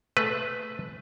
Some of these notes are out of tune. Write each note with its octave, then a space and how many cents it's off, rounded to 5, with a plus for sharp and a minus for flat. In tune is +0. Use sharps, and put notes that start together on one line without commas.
A3 +0 G#4 +0 B4 +0